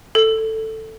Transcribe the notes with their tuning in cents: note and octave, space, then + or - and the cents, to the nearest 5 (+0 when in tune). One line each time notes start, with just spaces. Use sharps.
A4 +10